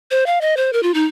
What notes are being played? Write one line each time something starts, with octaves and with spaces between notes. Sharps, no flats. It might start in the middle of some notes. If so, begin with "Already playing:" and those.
C5
F5
D#5
C5
A#4
F4
D#4